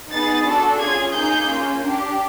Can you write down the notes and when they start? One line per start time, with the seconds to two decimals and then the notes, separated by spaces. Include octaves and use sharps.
0.11 B3 D#4 G#4 A6
0.45 D4 F#4 A4
0.79 C#4 F4 G#4 G#6
1.14 A#3 D#4 G#4 G6
1.48 A#3 C#4 F4
1.82 D4 G4